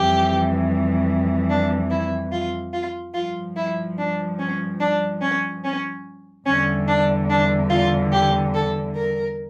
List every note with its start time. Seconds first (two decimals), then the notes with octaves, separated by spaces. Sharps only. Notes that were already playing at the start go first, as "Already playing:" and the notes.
Already playing: F2 E3 G3 G4
1.49 D4
1.91 E4
2.32 F4
2.73 F4
3.14 G2 F3 F4
3.56 E4
3.98 D4
4.39 C#4
4.80 D4
5.22 C#4
5.64 C#4
6.46 E2 D3 G3 C#4
6.88 D4
7.29 D4
7.70 F4
8.12 G4
8.54 A4
8.95 A#4